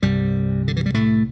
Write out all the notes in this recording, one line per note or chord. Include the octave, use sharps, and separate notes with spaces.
C2 G2 C3 G3
D3
E3
G3
A2 A3